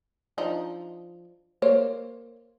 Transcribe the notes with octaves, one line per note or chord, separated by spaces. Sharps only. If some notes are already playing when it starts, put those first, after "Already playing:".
F3 D4 D#4
A#3 C5 C#5